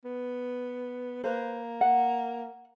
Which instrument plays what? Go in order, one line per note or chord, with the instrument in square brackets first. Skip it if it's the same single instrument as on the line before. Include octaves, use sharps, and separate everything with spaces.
[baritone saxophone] B3
[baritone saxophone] A#3 [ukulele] B4 C5
[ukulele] F#5